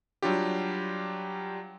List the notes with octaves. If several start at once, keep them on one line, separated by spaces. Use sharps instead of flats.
F#3 G3 D4 F4 G4